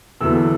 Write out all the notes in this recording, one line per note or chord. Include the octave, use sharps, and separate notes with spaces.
E2 D3 F#3 B3 E6